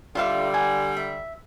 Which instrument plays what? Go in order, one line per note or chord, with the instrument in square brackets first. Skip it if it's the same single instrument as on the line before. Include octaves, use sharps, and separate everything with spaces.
[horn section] D3 G3 [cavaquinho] F4 E5 F5
[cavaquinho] F#5 G#5
E5